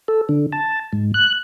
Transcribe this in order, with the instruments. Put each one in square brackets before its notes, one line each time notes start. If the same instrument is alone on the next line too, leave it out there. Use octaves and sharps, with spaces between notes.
[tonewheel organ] A4
D3
A5
G#2
F#6